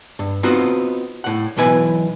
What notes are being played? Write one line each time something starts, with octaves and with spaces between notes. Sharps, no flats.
G2
B3 C4 D#4 F4 F#4
A2 F#5
B1 B2 E3 B4 G#5